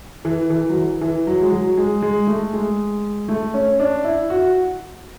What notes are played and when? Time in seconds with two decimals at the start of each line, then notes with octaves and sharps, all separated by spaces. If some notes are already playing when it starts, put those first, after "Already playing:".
0.25 E3
0.50 E3
0.70 F#3
0.77 E3
1.01 E3
1.27 F#3
1.41 G#3
1.52 F#3
1.77 G#3
2.02 G#3
2.27 A3
2.53 G#3
3.29 A3
3.54 C#4
3.80 D4
4.04 E4
4.30 F#4